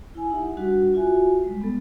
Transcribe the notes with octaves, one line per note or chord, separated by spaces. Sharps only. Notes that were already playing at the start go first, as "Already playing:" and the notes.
E4 G#5
D#4 G4 E5 F#5
G3 D4 F#4 F#5
F4 F#4 E5 G#5
G3 G#3
B3 A4